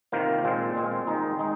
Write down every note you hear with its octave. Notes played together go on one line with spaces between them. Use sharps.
C3 D#3 A#3 F4 C5
A#2 G#3 C4
A#2 G#3 C4
D#3 G#3 D#4
G#3 D#4